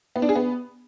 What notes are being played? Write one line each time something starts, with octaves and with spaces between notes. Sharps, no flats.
B3
D4
G#4
B3